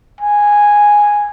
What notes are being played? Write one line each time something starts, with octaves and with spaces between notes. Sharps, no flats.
G#5